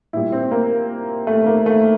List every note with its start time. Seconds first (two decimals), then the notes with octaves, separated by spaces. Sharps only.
0.13 A#2 G3 E4
0.32 C4
0.51 A#3
1.27 A3
1.46 A#3
1.66 A3